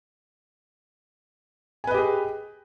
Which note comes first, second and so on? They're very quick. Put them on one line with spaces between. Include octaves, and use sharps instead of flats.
G#5 B4 D#5 G4 G#4